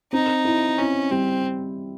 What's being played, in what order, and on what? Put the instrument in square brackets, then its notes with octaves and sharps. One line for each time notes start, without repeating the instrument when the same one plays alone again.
[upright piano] C4 [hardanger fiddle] D#4
[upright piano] E4
[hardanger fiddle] C#4 [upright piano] E4
[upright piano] G3 [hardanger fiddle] C4